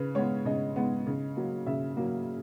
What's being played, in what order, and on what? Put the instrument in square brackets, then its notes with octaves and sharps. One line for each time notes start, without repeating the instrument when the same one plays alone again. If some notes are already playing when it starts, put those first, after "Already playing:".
Already playing: [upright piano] C#3 B4
G#3 B3 C#5
C#3 D#5
G#3 B3
C#3
F#3 A#3
C#3 E5
F#3 A#3